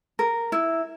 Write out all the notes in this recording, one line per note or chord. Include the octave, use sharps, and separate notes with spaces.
A#4
E4